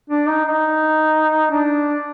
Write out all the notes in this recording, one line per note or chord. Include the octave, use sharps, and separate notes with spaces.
D4
D#4
D#4
D4